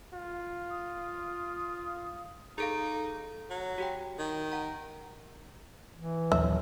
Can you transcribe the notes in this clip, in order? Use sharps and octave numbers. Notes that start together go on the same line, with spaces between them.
F4
D#6
D#4 G#4 A4 F5
F#3
F#4 G4 G5
D#3
F#5 A#5
E3
A#1 D#2 F#3 E5